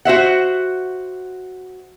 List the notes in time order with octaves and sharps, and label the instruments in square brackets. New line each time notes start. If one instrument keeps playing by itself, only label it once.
[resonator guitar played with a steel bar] F#4 C5 E5 F#5